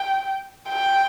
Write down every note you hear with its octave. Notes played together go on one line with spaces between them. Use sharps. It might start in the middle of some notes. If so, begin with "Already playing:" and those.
Already playing: G5
G5